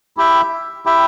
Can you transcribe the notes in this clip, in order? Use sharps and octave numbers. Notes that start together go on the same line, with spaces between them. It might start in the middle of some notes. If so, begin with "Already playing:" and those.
E4 G4 E5 G5
E4 G4 E5 G5